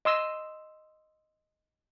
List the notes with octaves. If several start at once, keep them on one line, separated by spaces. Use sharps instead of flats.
D#5 C6 E6